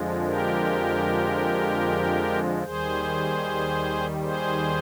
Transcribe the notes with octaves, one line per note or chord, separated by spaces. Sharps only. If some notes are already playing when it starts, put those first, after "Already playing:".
Already playing: F2 D3 F3 G#3
G4 A#4
D#2 D#3 G3 G#4 C5
G#4 C5